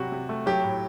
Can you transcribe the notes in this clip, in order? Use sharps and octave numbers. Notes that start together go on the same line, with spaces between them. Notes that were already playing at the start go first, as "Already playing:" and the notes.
Already playing: C3 F#3 G3 F#4
C3
A3
F#3 G4
A2